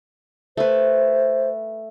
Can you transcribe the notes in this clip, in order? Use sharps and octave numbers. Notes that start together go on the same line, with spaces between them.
A3 B4 C5